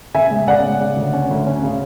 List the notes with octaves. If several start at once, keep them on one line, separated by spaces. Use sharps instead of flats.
C#3 E5 G#5
G#3
C#3 D5 F#5
G#3
C#3
D2
C#4
D2
C#4
C#3